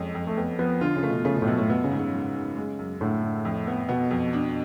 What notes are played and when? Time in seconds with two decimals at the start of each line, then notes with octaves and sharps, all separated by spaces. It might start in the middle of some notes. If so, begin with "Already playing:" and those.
Already playing: F2 G#3 C#4
0.15 F2
0.27 A3
0.37 F2 B3
0.59 F3 B3
0.81 D3 F4
0.96 C#3
1.03 A3
1.10 B2
1.25 C#3 A3
1.36 B2
1.42 A2
1.47 F#2 B2
1.58 A2
1.69 B2 B3
1.84 C#3
1.91 G#2
1.99 C#3
2.13 G#2
2.35 G#2
2.57 G#3
2.79 F#2
3.01 A2 D3
3.23 D3
3.45 F2
3.67 B3
3.89 B2 B3
4.11 F2
4.33 D4